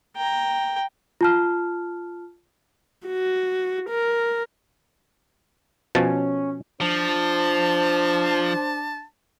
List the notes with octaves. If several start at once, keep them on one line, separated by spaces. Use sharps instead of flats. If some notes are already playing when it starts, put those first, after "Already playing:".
G5 A#5
F4 A5 F6
F#4
A#4
B2 F3 C#4 A5
F3 D4 C5 A5